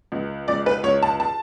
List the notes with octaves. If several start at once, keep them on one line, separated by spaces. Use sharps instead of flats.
C#2
C#2 D5
B4
C#2 C#5
A5
A5